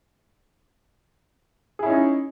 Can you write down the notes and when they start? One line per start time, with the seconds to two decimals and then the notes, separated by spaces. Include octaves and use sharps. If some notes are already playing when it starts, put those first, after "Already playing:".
1.79 G#4
1.83 E4
1.86 C#4
1.90 D#4